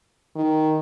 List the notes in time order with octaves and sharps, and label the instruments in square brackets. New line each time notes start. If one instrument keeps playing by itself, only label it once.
[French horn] D#3